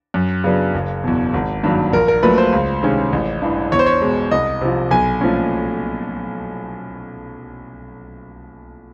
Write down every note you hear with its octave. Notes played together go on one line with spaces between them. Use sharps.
F#2
C#3 F#3 B3 D4
F#1
E2 B2
G#1
G2 D#3 F#3 A#3
A#1 A#4
A#4
A#2 F#3 A3 B4
C5
C#2
C3 D#3 G#3 C#4
A1
G2 E3
E2 C#5
C5
C#5
B2 G#3
C2 D#5
C3 F3
B1 G#5
A#2 F3 A3 C#4